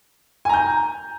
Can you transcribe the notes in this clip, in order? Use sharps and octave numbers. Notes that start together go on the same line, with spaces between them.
G#5 A#5 G6